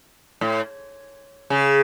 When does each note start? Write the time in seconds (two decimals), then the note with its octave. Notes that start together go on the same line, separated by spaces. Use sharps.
0.41 A2
1.50 C#3